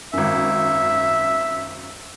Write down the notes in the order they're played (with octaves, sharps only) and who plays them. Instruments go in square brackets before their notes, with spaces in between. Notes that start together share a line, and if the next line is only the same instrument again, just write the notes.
[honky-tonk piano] G#1 F#2 [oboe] E5